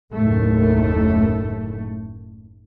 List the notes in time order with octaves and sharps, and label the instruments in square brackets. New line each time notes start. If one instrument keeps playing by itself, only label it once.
[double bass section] F#1 D#2 A2 A3